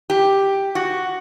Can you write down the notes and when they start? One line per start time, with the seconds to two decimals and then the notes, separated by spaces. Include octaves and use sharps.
0.10 G4
0.75 F#4